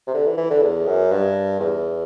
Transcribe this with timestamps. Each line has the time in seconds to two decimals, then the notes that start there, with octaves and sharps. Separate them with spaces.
0.07 C3
0.14 D3
0.26 E3
0.38 E3
0.51 D3
0.62 E2
0.86 F#2
1.11 G2
1.60 E2